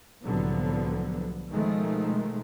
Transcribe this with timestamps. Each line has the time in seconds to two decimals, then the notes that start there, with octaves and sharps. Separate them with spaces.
0.23 C2 A2 D3 F3 F#3 B3
1.51 B2 D#3 F3 G#3 A3